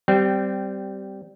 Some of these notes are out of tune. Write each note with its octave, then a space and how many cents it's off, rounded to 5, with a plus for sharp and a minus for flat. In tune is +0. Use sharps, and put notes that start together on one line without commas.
G3 -10 C4 -20